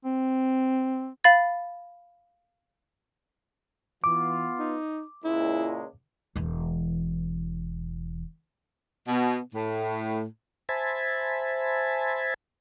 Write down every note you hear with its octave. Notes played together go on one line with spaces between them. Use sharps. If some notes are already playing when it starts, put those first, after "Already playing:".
C4
F5 B5 A6
E3 B3 F4 D6
D#4
C#2 A#2 G#3 E4
E1 E3
B2
A2
C5 E5 G#5 A5 B5